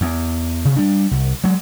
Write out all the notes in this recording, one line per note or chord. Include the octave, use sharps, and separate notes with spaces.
E2
C3
G3 D4
C2
F#3 G#3